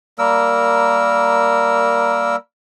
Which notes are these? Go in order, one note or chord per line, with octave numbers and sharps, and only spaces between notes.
G3 A#3 A#4 E6